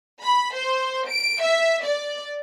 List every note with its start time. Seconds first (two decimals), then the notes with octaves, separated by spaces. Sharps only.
0.23 B5
0.55 C5
1.09 D7
1.42 E5
1.84 D5